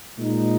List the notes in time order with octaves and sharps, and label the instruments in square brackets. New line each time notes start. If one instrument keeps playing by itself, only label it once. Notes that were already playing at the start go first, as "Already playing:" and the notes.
[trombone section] A#2 G#3 D#4